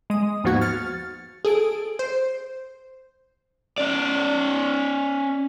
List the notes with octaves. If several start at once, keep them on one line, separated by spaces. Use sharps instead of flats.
G#3 D#6
D#2 G#2 F3 B3 F#4 G#6
F6 A6 C#7
G#4 A4 D7
C5
C#4 D5